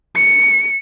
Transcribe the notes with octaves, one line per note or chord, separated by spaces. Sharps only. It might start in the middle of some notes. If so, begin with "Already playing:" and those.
C#7